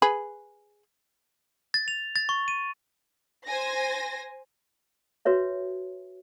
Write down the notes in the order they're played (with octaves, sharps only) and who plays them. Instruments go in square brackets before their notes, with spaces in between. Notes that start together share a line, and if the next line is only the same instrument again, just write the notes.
[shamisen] G#4 B4
[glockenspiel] A6
F7
A6
C#6
D#7
[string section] C5 G#5 A#6
[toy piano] F#4 B4 C#5 E5